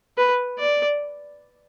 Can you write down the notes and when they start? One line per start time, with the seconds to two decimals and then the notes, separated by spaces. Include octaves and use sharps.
0.18 B4
0.59 D5